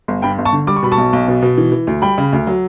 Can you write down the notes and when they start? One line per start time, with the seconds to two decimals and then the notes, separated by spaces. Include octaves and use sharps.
0.08 G1
0.22 G2 G5 B5
0.38 G1
0.45 A5 C#6
0.53 D3
0.67 G3 D6
0.76 C#6
0.83 B2 B5
0.92 A5 C#6
0.98 B1
1.13 B1
1.28 B2
1.42 B2
1.58 E3
1.72 E3
1.87 D2
2.02 G3 G5 B5
2.18 C#3
2.33 D2
2.47 F#3